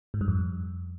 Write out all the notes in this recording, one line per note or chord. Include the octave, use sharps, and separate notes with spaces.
G#2
G2
F2